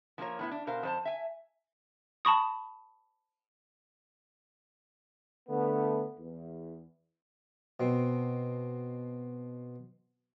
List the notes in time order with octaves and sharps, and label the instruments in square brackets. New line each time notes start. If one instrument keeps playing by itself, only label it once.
[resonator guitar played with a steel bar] F3 A#3 C4 F4 A#4 C#5
A2 B3 E4
D4
B2 A#4 C5 F5
F2 C5 A5
E5 G#5
[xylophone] A5 B5 C#6 D#6
[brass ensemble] D3 A3 B3
E2
[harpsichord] B2 C4